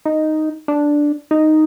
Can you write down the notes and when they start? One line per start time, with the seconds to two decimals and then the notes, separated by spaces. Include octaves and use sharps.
0.05 D#4
0.68 D4
1.31 D#4